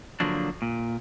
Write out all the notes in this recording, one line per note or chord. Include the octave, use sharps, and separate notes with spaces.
D3 F3 F#3 A#3 D4
A#2